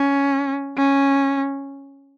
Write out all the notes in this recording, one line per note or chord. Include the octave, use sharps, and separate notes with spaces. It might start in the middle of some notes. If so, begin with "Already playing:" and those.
Already playing: C#4
C#4